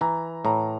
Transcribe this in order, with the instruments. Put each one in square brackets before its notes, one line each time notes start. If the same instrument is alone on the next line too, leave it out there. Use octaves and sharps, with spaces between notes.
[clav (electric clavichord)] E3 [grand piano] A#5
[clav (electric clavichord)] A2 [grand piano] A#5